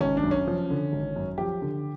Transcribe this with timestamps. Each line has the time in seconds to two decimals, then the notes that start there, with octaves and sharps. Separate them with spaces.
0.01 G#1 C#4
0.17 D4
0.23 F#2
0.31 C#4
0.47 F3
0.70 D3
0.93 G#1
1.16 F#2
1.38 F3 G4
1.62 D3